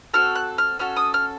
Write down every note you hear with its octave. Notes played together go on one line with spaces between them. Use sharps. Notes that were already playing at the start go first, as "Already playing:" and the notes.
C4 F#4 A4 F6
F#6
F6
C#4 F#4 A4 F6
D#6
F6